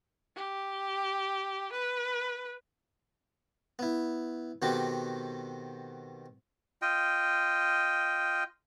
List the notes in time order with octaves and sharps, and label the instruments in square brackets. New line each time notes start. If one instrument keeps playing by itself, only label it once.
[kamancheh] G4
B4
[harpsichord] B3 E4
B2 D#3 C4 F#4 G4 A4
[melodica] F4 D#5 G5